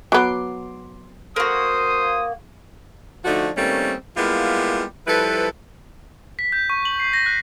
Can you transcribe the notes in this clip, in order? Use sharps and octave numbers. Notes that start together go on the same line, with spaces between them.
F#3 B3 C6 D6
A#3 F#4 C5 D#6
D3 F3 A3 D4 D#4 F#4
D#3 G3 A3 A#3 C4 C#4
G3 G#3 A#3 B3 E4 F4
F3 G3 E4 A4 B4
B6
G6
C#6
F#7
C7
A#6
F#6